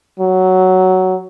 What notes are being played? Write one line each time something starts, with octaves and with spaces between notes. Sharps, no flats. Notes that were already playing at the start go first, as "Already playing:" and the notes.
F#3